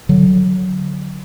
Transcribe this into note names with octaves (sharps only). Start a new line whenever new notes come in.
D3 F#3